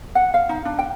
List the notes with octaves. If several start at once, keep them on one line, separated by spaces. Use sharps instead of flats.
F#5
F5
D#4
D4
G5